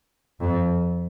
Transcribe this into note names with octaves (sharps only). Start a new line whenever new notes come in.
F2